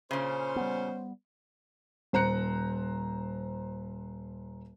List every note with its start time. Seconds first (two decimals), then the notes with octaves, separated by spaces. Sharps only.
0.11 A#2 C#3 C#4 C5
0.56 G3 B3
2.13 D#1 C5 A#5 F#6 C#7